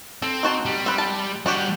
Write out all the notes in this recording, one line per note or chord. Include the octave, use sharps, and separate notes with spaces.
C4 A4
D#3 F#4 A5
G3
C4 B4
A5
G3 D4 F#4 G4 F#5